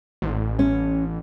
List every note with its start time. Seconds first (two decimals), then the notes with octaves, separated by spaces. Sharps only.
0.22 A1
0.59 C#4